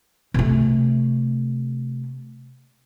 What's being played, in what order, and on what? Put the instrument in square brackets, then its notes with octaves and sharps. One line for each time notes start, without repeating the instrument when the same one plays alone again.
[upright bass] C3 A3